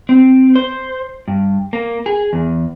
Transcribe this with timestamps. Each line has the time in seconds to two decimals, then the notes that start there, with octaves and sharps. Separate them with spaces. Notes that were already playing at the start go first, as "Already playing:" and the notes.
0.09 C4
0.56 C5
1.28 G2
1.73 A#3
2.06 G#4
2.33 E2